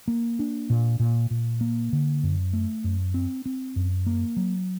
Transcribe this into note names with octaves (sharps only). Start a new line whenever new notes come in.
A#3
D4
A#2
A#2
A#2
A#3
D3
F#2
A3
F#2
C4
C4
F#2
A#3
F#3